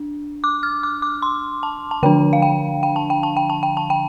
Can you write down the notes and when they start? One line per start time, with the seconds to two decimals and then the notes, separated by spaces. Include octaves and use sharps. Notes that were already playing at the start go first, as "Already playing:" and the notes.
Already playing: D4
0.44 D6
0.63 F6
0.83 D6
1.02 D6
1.22 C6
1.63 A5
1.91 A5
2.03 D3 F3 D4 G5
2.33 F5
2.42 G5
2.83 G5
2.96 A5
3.10 G5
3.23 A5
3.37 G5
3.50 A5
3.63 G5
3.77 A5
3.90 G5